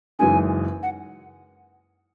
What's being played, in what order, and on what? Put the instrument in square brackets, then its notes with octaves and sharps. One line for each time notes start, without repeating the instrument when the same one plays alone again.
[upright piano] F#1 F#2 E3 G#3 D#4 [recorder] G#5
[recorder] F#5